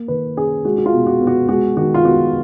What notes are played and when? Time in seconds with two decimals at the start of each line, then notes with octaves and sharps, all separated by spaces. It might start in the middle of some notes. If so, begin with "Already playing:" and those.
Already playing: A#3
0.08 D#3 B4
0.37 C#4 G#4
0.65 G#3 F#4
0.78 F#4
0.86 F4
0.93 B2
1.06 F#4
1.21 B3
1.27 F#4
1.48 G#3 F#4
1.77 D#3 F#4
1.94 F4
2.05 B3 F#4